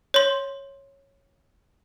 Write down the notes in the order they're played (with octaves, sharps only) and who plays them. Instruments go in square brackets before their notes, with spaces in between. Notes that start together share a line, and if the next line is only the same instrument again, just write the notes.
[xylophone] C#5 C6